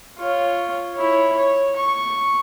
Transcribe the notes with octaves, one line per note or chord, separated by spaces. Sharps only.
F4 C#5
E4 C#5
C#5
C#6